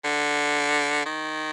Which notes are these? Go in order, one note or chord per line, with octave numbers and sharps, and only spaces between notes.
D3
D#3